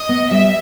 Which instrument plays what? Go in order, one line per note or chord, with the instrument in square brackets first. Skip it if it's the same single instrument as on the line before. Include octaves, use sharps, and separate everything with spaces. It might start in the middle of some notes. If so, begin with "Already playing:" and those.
Already playing: [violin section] D#5
[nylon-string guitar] B3
[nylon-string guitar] G3 [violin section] E5